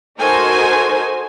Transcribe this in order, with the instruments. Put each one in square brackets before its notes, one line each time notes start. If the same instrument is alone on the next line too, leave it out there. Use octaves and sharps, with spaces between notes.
[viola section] D#4 F#4 A4 A#4 C5 G#5